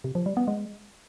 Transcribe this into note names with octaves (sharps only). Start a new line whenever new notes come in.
C3
F3
G3
B3
G#3